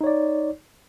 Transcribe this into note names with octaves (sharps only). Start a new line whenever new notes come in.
D#4 C#5 D5